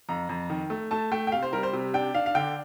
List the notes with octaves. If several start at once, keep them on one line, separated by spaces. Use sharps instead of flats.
F2 A#5
F2
D#3
A3
A3 A5
A3 G5
G5
C3 F5
C5
G3 A#4
C5
C3
D4 G5
D4 F5
F5
D3 G5